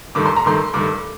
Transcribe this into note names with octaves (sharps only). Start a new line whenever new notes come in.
G2 D#3 A3 D6
C6
A#5
G2 D#3 A3 C6
G2 D#3 A3 D6